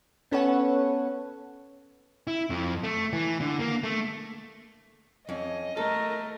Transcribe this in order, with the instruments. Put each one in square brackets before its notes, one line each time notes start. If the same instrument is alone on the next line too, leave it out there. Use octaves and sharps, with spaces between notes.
[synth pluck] B3 C#4 A4 B4 C#5 F#5
[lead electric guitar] E4
F2
A3
E3
D3
A#3
A3
[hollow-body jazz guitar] F2 C#4 [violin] D#5
[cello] A3 [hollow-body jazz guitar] A4 [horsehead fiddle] A#4